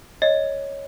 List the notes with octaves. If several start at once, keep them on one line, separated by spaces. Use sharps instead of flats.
C#5 D#5